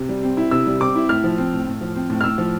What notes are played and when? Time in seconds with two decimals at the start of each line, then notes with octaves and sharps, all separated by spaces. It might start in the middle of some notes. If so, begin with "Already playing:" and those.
Already playing: C3
0.09 G3
0.23 C4
0.37 E4
0.51 C3 E6
0.67 G3
0.80 C4 D6
0.95 E4
1.09 A2 F6
1.24 F3
1.38 C4
1.53 A2
1.67 A2
1.81 F3
1.95 C4
2.10 A2
2.21 F6
2.24 A2 E6
2.38 F3